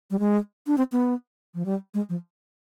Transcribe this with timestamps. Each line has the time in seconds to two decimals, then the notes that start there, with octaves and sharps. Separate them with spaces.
0.11 G3
0.19 G#3
0.67 D4
0.78 C4
0.92 B3
1.55 F3
1.66 G3
1.94 G#3
2.09 F3